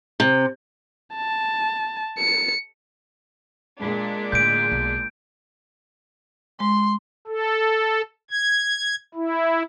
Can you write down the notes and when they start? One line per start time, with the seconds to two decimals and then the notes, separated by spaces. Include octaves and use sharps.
0.20 C3
1.15 A5
2.18 C#7
3.79 A#2 G#3 D4
4.32 A2 D3 G6 D7
4.72 B1
6.60 G#3 C6
7.27 A4
8.31 G#6
9.15 E4